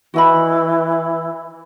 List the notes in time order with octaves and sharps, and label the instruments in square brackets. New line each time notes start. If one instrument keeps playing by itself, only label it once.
[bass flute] E3 [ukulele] F#4 D#5 B5